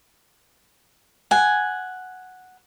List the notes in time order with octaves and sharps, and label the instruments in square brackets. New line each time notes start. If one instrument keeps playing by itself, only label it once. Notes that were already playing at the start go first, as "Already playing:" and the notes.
[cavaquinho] F#5 G#5